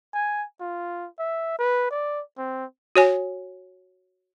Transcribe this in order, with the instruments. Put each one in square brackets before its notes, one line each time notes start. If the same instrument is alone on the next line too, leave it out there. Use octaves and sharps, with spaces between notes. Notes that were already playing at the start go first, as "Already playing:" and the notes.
[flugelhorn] G#5
F4
E5
B4
D5
C4
[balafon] F#4 C#5 G#5